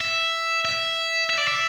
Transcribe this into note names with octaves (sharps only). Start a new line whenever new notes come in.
E5
E5
E5
D5
E5